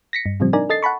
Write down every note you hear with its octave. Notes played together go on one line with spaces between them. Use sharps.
A#6 B6 C#7
G2
A2 C#3 F3 G3 C4
D4 D#4 A#4 D5 G#5
A4 D#5 A6 C7
F#5 A5 B5 C#6